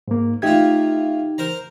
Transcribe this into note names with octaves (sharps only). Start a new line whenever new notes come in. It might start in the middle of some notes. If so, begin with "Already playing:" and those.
G#2 A#3
A3 D#4 F4 G4 G#6
A#4 C5 A#5